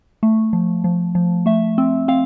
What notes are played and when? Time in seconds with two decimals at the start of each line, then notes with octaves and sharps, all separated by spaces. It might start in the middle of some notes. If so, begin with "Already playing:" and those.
0.23 A3
0.53 F3
0.84 F3
1.15 F3
1.46 A3 E5
1.78 C4
2.08 C4 F5